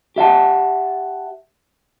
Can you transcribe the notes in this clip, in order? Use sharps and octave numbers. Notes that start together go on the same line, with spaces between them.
G4 E5 F#5 A5